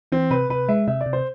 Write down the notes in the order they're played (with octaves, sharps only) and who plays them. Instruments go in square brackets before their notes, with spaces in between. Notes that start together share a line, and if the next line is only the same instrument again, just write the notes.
[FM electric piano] E3 [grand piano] C4
[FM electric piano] C3 [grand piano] B4
[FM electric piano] C3 [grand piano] B4
[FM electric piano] G#3 [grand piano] E5
[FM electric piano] C3 [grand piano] E5
[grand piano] D5
[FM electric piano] C3
[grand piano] C5